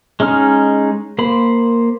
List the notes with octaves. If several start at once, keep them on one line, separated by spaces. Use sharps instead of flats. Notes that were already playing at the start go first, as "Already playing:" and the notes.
G#3 C#4 D#4 F6
A#3 C5 B5